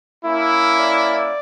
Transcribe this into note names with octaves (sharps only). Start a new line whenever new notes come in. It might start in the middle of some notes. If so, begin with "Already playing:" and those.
A#3 C#4 E4
D5